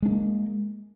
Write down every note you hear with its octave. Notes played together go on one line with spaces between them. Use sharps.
G#3 A#3 D4